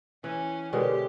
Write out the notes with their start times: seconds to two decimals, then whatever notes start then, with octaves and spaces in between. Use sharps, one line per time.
0.24 E3 C#4
0.73 B2 D3 G#3 G4 A#4 B4 C#5